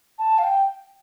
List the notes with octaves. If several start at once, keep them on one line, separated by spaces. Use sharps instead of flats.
A5
F5
G5